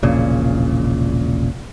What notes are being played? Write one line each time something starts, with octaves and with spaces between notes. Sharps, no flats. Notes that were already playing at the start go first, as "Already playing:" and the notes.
E1 A#1 A#2 C#3